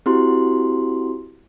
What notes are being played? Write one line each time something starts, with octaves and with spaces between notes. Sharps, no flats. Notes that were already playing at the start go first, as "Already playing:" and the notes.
C4 E4 F#4 G4 C6